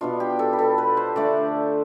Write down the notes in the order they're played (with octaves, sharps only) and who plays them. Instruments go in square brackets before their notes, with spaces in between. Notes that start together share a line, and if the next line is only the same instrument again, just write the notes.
[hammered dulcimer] B2 B3 D4 F4
G4
A4
B4
A4
B4
C5
D3 A3 D4 D5